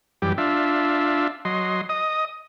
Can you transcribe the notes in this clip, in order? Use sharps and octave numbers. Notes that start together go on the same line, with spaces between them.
F#2 E3 G3 G4
D4 F4 E5
F#3 D#5 C6
D#5 D#6